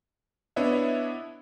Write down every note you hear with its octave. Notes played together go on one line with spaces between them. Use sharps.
B3 D4 E4 C#5 D#5 E5